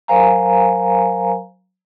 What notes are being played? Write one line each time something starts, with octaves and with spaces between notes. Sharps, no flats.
F#3 A#4 C5 F5 G#5 A#5